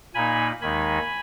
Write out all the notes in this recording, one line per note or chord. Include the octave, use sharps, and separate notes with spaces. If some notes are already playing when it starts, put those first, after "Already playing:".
A#2 A#3 D#4 G#5 B5
D#2 D#3 G#3 D#4 G#5 B5